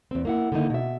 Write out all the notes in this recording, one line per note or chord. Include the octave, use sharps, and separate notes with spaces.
E2 C4
A#3 E4 F#5
D3 D#3 A#3 D#4 E4
B2 E5